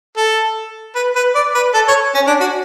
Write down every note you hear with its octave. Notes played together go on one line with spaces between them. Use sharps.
A4
B4
B4
D5
B4
A4
C#5
C#4
D4
F#4